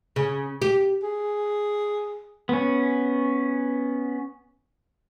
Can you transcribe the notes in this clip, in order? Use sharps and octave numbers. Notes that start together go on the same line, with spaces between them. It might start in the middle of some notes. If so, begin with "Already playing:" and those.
C#3
G4
G#4
B3 C#4